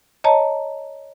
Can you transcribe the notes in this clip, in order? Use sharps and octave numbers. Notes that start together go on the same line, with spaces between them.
C#5 D#5 A5 A#5